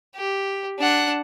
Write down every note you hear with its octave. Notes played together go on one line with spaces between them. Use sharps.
G4
D4 F#5